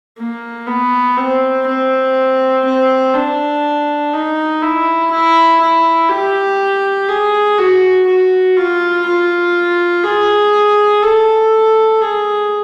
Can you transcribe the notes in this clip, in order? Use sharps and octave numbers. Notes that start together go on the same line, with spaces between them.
A#3
B3
C4
C4
C4
D4
D#4
E4
E4
E4
G4
G#4
F#4
F#4
F4
F4
G#4
A4
G#4